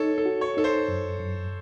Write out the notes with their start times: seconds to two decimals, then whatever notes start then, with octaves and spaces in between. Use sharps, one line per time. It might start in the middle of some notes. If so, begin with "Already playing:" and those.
Already playing: D#4 A4 C#5
0.18 A4
0.26 F#4
0.41 C#5
0.57 D#4 A4
0.64 C5
0.88 F#2
1.19 F#2